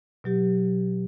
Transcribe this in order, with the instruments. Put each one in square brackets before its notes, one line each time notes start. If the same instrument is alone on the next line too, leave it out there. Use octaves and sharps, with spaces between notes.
[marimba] B2 F#3 G4